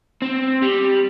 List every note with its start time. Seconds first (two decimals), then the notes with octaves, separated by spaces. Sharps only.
0.22 C4
0.62 G3